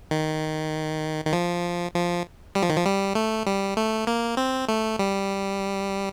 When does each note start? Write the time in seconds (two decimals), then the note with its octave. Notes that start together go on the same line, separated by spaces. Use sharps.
0.11 D#3
1.26 D#3
1.33 F3
1.95 F3
2.55 G3
2.62 F3
2.69 D#3
2.76 F3
2.86 G3
3.15 A3
3.46 G3
3.77 A3
4.07 A#3
4.37 C4
4.69 A3
4.99 G3